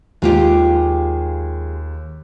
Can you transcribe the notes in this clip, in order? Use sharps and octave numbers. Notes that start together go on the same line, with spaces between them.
D#2 G#3 F4 G4